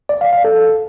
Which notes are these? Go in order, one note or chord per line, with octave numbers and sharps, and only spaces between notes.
D5
F5
F5
A4